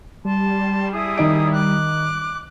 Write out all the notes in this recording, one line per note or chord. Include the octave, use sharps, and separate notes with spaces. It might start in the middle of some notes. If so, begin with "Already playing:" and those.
G3 A5 C6
E4 G#4 D#6
D#3 D#4 D7
D6 F#6